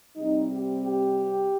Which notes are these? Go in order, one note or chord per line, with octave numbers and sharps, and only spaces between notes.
C3 G3 C4 D#4
G4
G4